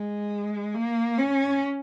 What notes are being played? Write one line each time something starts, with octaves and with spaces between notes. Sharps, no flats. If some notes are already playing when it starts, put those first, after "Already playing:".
Already playing: G#3
A#3
C#4